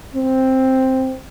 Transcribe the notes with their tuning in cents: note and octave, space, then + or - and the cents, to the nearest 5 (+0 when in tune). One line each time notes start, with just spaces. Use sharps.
C4 +5